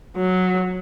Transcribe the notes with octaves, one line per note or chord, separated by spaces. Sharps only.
F#3